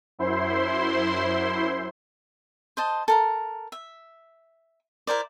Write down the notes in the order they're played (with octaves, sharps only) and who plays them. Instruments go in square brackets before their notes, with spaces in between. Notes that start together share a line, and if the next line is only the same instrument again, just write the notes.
[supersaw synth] F#2 E4 C5 C6
[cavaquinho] C5 D#5 A5
A4 A#4 A#5
E5
E4 A#4 C5 D5